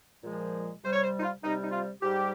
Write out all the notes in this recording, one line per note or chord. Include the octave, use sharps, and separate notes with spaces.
A#2 F3 G#3
C3 G3 C5
C#5
C5
D#4
F4
C3 G3 D#4
D#4
F4
G#2 G3 G4